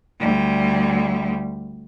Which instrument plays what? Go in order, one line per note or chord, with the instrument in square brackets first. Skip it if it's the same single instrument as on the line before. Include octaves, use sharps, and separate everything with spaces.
[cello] D2 G3